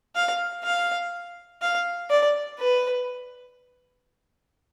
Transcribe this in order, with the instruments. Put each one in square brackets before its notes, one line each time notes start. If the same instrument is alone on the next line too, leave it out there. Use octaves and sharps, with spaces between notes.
[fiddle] F5
F5
F5
D5
B4